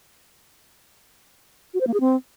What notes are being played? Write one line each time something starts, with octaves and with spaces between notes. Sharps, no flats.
F#4
C5
A#3
G#4
C4